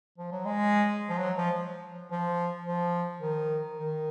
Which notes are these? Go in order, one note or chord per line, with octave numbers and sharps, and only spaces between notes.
F3
F#3
G#3
F3
F#3
F3
F3
F3
D#3
D#3